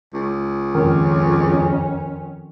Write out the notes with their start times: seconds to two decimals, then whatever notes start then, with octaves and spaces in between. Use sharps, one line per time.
0.14 C#2
0.75 F2 D#3 C#4